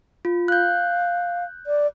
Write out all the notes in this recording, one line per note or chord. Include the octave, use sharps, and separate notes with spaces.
F4
F5 F#6 G6
D5